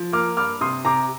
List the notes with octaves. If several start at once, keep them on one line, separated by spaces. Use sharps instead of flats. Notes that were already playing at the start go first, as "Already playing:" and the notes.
Already playing: F3
A#3 D6 F6
G2 D6 F6
C3 C6 D#6
C3 A#5 D6